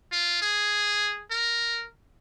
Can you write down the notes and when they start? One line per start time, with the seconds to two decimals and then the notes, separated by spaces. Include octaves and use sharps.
0.12 F4
0.42 G#4
1.31 A#4